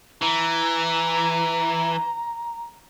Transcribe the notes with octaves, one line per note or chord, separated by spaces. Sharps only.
E3 A#5